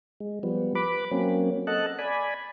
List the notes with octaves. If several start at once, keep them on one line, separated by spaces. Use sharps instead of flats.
G#3
F3 G3 B3
B4 B5 D6
F#3 A#3 C4 C#4
A4 D#5 F#5 A5 F#6
D5 G#5 B5